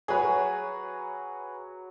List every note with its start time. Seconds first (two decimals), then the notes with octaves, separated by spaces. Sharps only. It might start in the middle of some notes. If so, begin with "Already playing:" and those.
0.08 F#3 G#4 B4 C#5